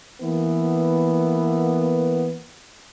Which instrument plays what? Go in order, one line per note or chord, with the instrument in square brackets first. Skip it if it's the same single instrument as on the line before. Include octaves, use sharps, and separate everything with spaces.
[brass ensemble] E3 A#3 B3